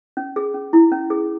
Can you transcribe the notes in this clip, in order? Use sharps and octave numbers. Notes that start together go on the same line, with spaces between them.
C#4
G#4
C#4
E4
C#4
G#4